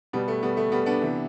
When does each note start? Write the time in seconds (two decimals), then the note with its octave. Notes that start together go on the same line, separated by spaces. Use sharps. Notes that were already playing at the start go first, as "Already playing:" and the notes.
0.13 B2 G3 B3
0.28 A3
0.43 G3 B3
0.57 A3
0.72 G3 B3
0.86 B3 D4
1.01 C3 E3